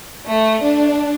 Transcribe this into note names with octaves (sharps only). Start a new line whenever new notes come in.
A3
D4